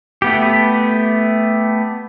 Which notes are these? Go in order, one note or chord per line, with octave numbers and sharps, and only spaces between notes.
A3 B3 G4